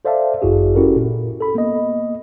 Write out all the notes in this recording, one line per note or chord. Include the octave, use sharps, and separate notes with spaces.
A4 C5 D5 E5 F5 A5
G1 F#2 E4 F#4 G#4 D5
C#4 E4 F#4 G4 A4 A#4
A#2
A4 B5
A#3 B3 D#5